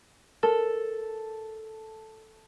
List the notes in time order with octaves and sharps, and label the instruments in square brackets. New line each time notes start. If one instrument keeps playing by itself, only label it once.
[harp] A4 [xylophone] A#4